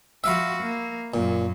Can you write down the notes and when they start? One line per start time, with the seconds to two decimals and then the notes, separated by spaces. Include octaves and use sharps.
0.24 F3 F#4 E5 F5 B5
0.63 A#3
1.14 F#2 A#2